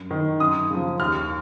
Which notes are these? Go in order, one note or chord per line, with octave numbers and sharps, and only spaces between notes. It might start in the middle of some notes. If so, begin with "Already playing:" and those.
Already playing: F#2
D#3
F#2 D#6
C#3 F3
D#2 F6